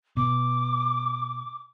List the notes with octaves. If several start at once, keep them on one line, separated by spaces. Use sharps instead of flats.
B2 D6